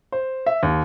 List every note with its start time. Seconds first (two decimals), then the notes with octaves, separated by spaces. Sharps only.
0.12 C5
0.46 E5
0.63 D#2